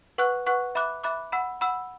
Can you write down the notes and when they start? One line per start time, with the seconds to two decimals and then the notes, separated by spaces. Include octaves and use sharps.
0.18 B4 F#5 C#6 F#6
0.46 B4 F#5 C#6 F#6
0.75 E5 B5 D6 F#6
1.04 E5 B5 D6 F#6
1.32 F#5 B5 E6
1.61 F#5 B5 E6